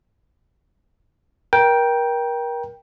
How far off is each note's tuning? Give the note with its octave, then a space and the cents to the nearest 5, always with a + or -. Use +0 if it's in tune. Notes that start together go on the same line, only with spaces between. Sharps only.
A#4 +30 G5 +0